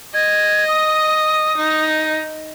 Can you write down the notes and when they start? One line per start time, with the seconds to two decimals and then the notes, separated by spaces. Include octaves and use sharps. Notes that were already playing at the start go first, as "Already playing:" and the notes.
0.14 D#5 G#6
0.68 D#6
1.57 D#4